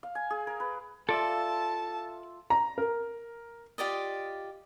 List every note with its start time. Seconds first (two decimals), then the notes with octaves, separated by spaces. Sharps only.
0.03 F5
0.15 G#5
0.30 G#4
0.47 A#4
0.60 B4
1.09 F4 A4 D5 E5 A5
2.50 A#5
2.78 A#4
3.78 F4 G4 D5 D#5